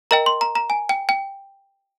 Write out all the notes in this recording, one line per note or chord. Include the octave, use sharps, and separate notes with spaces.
A#4 D#5 G5 A#5
C6
A#5
A#5
G#5
G5
G5